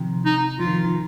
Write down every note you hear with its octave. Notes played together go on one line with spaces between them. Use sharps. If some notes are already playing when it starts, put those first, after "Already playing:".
Already playing: C3 D#3 F3
D#4
F3 F4
D#3
D#3